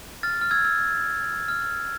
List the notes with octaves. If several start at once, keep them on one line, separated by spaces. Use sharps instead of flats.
F6 A6
F6
E6 G#6
E6
F6